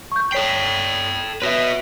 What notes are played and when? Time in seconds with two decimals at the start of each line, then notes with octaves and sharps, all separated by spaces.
0.12 C#6 G6
0.32 A4 C#5 G5 B6 C7
1.42 F#4 B4 C#5 E5